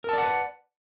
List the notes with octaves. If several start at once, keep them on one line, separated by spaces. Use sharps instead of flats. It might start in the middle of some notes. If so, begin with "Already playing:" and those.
A#4 B4 D5 F#5 A5